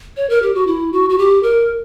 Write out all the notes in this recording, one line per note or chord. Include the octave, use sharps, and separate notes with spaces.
C#5
A#4
G4
F#4
E4
F#4
F#4
G4
A#4